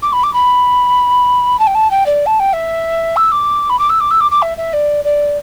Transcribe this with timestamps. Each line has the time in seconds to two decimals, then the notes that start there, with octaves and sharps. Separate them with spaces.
0.03 D6
0.13 B5
0.23 D6
0.34 B5
1.59 A5
1.67 G5
1.75 A5
1.91 G5
2.06 D5
2.26 A5
2.40 G5
2.53 E5
3.16 E6
3.32 D6
3.70 B5
3.79 D6
3.90 E6
4.00 D6
4.11 E6
4.21 D6
4.31 D6
4.42 E5
4.58 E5
4.73 D5
5.05 D5